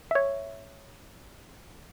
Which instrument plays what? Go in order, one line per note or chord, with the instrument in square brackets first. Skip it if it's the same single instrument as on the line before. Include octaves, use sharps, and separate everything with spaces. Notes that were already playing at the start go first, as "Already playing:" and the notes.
[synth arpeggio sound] C#5 E5